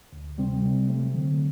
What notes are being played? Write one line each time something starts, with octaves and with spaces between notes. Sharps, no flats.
D2
C3 G3 C4
C3
F#3 A3 C4
D3